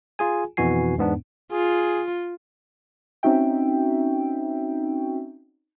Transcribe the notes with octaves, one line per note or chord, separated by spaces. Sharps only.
F4 G#4 G#5
F2 B2 E3 F#4 G#5 C7
E2 G#2 B3 D4
F4 G#4
C4 C#4 D#4 F#4 E5 G5